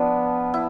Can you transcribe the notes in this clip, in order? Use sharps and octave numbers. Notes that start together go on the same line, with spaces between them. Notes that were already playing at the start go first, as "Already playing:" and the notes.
Already playing: F3 B3 D4
E4